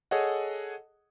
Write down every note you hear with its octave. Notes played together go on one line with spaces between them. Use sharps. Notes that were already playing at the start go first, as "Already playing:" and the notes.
G#4 A4 C#5 D#5 F#5